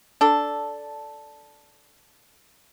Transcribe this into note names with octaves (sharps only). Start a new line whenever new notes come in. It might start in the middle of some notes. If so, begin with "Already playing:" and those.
D4 A4